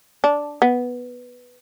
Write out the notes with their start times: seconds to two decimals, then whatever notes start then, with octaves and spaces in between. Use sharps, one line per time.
0.24 D4
0.62 B3